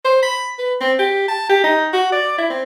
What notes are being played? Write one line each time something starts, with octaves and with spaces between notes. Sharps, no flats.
C5
B5
B4
C4
G4
A5
G4
D#4
F#4
D5
E4
C4